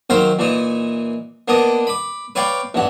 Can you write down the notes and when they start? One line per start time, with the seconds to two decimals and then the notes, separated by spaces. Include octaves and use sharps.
0.10 D#3 F#3 A#4 C5 F5
0.39 A#2 E3 D#4
1.48 A#3 B3 D4 D#5
1.87 B5 D6
2.35 B4 C#5 D5 F5 G5 D6
2.74 A1 G2 F#5